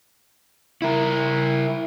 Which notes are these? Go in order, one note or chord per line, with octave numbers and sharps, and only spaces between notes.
E4 A#4